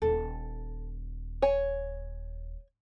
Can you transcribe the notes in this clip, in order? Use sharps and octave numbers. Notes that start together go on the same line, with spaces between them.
D#1 A4
C#5 G#5